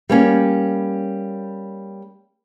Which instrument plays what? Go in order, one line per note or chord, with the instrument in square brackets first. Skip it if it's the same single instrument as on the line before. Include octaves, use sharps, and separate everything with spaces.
[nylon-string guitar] G3 A#3 C#4